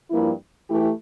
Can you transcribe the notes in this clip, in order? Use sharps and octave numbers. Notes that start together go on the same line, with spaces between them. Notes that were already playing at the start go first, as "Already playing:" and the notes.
G2 F3 A#3 E4
E3 A3 E4 G4